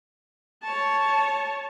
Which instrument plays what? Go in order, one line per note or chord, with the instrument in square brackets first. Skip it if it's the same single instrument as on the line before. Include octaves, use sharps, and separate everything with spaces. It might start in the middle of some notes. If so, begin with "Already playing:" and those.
[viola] C#5 A5